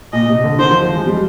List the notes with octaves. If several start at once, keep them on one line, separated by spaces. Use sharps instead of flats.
A#2 D#5
C3
D3
D#3 C5
F3
F3
G#3
G3